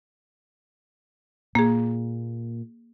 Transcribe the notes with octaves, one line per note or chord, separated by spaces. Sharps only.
A#2 A#3 G#4